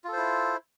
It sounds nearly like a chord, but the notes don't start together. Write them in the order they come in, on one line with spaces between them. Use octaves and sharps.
F4 A4 C5 E4